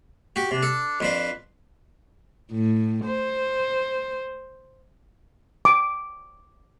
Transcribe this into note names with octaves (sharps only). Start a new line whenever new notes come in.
F#4 G4
C3 D4
A4
F2 F3 D4 B4
A2
C5
D6